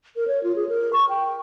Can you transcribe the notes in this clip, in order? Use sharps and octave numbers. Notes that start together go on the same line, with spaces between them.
A#4
C#5
F4
G#4
A#4
C#6
G5